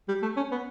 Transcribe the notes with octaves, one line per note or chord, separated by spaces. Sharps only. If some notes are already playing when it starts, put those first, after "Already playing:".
G3
A3
C#4
B3